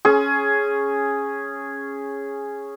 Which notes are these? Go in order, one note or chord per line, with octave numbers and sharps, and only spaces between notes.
C#4 G#4